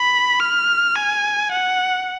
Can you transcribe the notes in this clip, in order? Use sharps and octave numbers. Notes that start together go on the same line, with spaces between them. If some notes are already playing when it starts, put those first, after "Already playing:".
Already playing: B5
F6
G#5
F#5